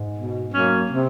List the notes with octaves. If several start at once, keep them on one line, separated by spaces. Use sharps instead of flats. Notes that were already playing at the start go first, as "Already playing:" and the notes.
Already playing: G#2
B2
F#3 A#3 C#4
C3